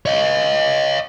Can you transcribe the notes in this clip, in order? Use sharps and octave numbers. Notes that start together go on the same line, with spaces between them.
C#5 D#5